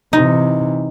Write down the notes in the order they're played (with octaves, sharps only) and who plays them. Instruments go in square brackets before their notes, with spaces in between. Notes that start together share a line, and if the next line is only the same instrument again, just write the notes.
[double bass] C3 E3 [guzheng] D#4